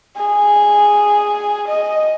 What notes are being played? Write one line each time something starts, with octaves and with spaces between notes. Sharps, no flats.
G#4
D#5